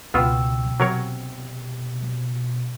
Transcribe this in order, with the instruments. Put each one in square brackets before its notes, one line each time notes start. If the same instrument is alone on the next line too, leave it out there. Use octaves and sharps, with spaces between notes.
[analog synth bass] C#2 [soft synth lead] B2 [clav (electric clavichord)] B3 F4 [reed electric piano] G5 C#6 E6
[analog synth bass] C3 [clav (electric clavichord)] F#3 A#4 C#5